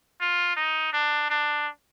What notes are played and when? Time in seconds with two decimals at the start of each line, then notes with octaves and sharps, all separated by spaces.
0.21 F4
0.56 D#4
0.93 D4
1.30 D4